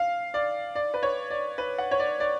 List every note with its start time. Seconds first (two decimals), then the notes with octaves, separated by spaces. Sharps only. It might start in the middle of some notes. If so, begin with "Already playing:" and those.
Already playing: F5
0.34 D5
0.75 D5
0.94 B4
1.03 C#5
1.30 D5
1.58 B4
1.78 F#5
1.91 C#5
1.99 D5
2.20 D5